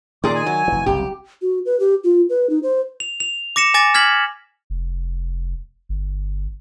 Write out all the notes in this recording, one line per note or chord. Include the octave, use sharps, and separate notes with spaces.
A#2 D#3 G#4 D6
G#5
F#3
F1 E3
F#1 C2 G4
F#4
B4
G4
F4
B4
D#4
C5
F7
F7
D6 A#6 C#7 E7
G#5 D6 A6 A#6
F6 G#6 B6 F#7
F1
G1